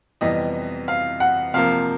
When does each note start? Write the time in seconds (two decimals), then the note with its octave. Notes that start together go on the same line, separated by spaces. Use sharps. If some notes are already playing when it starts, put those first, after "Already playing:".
0.21 F2 C3 E3 G3 B3 D#5
0.88 F5
1.20 F#5
1.54 C3 F3 A#3 F5